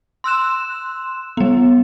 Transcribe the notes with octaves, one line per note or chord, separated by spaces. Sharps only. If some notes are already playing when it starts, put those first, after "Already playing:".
C6 E6 F#6 E7
G3 B3